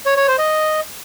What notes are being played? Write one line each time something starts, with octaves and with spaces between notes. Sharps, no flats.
C#5
C#5
C5
D#5